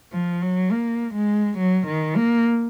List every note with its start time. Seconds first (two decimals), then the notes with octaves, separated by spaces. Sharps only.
0.13 F3
0.42 F#3
0.71 A#3
1.14 G#3
1.58 F#3
1.87 D#3
2.16 A#3